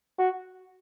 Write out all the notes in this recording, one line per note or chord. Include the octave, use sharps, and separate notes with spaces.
F#4